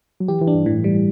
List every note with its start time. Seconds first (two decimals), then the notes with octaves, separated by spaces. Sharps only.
0.20 F#3
0.28 E3 G4
0.42 E3
0.48 D4
0.54 G2
0.66 A2 E3
0.84 G3